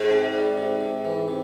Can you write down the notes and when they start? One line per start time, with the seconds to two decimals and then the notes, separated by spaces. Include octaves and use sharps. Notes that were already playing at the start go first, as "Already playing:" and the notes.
Already playing: G#2
0.10 C3
0.33 G3
0.58 C3
0.81 C3
1.05 E3
1.28 C3